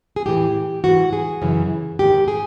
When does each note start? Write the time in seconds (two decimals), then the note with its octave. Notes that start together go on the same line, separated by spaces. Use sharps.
0.16 G#4
0.26 A2 E3 G4
0.84 G#2 E3 F#4
1.13 G#4
1.42 F#2 C#3 E3
1.99 G#2 D#3 G4
2.28 G#4